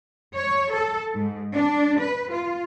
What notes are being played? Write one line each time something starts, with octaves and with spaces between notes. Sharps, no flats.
C#5
A4
G#2
D4
B4
F4